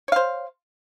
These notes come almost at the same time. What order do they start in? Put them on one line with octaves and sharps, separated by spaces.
C#5 F5 C5